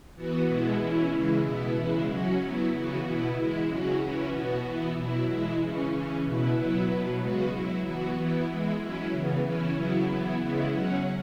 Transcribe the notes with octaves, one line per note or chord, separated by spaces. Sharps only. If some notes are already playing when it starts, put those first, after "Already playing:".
E3 B3 F#4
B2 G#3 B3 E4
E3 C#4 E4
C#3 E3 G#3 E4
B2 B3 E4
C#3 E3 G#3 E4
F#3 C#4 F#4
F#3 B3 E4
C#3 E3 B3 F#4
B2 B3 E4
E3 G#3 E4
C#3 F#3 C#4 F#4
E3 C#4 E4
B2 B3 F#4
E3 B3 E4
B2 F#3 E4
E3 G#3 E4
C#3 E3 C#4
C#3 E3 C#4
B2 B3 E4
F#3 B3 E4
B2 F#3 B3
C#3 G#3 B3 F#4
F#3 E4
E3 B3 F#4
E3 B3 E4
E3 G#3 E4
F#3 C#4 E4
C#3 E3 B3
E3 C#4 E4
C#3 F#3 B3 E4
E3 B3 E4
C#3 G#3 B3 E4
F#3 C#4 F#4